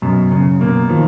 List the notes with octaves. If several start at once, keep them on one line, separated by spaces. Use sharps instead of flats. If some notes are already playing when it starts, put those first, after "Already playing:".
F#2 B2
F#2 C#3
B2 A#3
D#3 F3